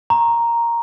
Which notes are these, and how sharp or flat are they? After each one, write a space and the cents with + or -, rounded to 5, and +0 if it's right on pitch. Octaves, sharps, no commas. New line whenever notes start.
A#5 +0 C#6 -40